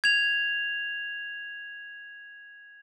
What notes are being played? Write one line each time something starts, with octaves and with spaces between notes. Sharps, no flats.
G#6 F7